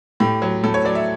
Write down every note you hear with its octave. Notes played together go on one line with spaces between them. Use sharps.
A2 G4
F#3
A2 A4
C#5
F#3 D5
E5